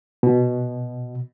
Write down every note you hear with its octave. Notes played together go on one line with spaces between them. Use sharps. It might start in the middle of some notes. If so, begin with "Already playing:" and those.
B2